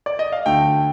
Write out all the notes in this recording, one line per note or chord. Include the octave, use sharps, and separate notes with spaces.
D5
D#5
F5
D2 D3 A3 G5